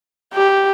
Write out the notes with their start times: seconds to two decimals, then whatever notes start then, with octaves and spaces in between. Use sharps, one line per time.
0.34 G4